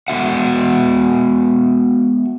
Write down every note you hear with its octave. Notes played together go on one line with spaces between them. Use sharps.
G#3 B3 F#4 E5 F#5